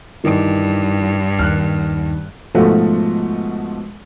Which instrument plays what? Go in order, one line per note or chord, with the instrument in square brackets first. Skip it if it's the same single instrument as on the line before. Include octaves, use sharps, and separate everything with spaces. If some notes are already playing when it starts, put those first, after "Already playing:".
[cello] G2 [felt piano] D#3 E3
[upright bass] D#2 [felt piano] F6 F#6
[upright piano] G#2 B2 F3 A3 F#4